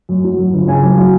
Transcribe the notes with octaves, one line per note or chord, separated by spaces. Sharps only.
F#2
F#3
F#2
G1
C#3 G#5
F#2
F#3